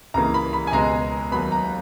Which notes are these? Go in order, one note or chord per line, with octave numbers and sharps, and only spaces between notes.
C#2 C#3 E3 A#3 A#5
B5
B5
G#5
C#2 B2 G#3 B3 A#5
D#2 D#3 F#3 B3 B5
A#5